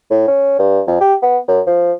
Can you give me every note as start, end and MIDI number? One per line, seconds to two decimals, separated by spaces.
0.11 0.24 45
0.28 0.55 61
0.59 0.82 43
0.87 0.99 41
1.01 1.15 67
1.22 1.38 59
1.48 1.61 42
1.67 1.92 53